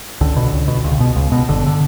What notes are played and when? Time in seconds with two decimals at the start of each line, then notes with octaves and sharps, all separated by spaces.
0.21 C#2 D3
0.36 B2
0.53 C#2
0.68 B2
0.84 C#2
1.00 B2
1.16 C#2
1.32 B2
1.48 G1 D3
1.66 D3